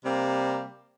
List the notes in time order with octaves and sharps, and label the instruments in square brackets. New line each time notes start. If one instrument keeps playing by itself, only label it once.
[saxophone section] C3 G3 A#3 C4